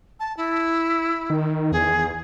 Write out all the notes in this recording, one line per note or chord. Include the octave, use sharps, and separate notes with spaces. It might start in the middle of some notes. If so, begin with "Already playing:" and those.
A5
E4
D#3
E2 G#4